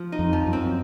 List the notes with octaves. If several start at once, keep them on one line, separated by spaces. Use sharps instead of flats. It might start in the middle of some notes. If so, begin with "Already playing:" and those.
Already playing: F3
D#4
F2
F3
F#2
C4